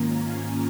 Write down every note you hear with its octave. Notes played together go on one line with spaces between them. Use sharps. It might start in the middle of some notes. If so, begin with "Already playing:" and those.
Already playing: G#2 D#3 A#3 C#4 F4 A#5
G#5